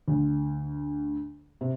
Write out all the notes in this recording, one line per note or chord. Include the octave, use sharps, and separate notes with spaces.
D2
C3